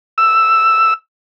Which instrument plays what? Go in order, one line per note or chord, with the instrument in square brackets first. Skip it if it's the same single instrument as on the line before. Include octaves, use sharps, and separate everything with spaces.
[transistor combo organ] E6